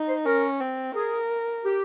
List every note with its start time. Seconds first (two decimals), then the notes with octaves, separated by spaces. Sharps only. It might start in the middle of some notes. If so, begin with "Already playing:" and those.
Already playing: D#4
0.09 C5
0.26 C#4 A#4
0.61 C4
0.95 G#4 A#4
1.65 G4